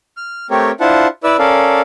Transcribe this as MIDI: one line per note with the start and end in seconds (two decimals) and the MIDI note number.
0.17 0.47 89
0.50 0.71 57
0.50 0.71 60
0.50 0.71 67
0.50 0.71 70
0.50 0.71 73
0.80 1.07 62
0.80 1.07 64
0.80 1.07 65
0.80 1.07 72
0.80 1.07 78
0.80 1.07 81
1.24 1.37 64
1.24 1.37 71
1.24 1.37 74
1.24 1.37 88
1.39 1.81 61
1.39 1.81 69
1.39 1.81 70
1.39 1.81 74
1.39 1.81 77